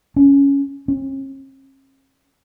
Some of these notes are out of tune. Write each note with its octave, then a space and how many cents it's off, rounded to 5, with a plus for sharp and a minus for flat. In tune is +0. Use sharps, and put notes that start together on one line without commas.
C#4 +10
C#4 -45